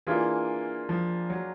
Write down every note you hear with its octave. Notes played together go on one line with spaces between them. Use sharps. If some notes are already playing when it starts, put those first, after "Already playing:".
E3 A#3 D4 F4 G#4
F3
F#3